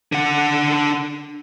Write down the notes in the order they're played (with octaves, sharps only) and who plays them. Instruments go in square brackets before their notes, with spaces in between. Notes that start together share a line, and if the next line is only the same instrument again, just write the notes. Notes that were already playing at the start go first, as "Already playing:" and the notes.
[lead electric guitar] D3 F#5